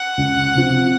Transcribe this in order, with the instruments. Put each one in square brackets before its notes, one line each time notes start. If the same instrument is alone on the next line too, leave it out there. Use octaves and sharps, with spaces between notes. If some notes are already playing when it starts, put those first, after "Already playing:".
Already playing: [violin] F#5
[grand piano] C#2
C3 F3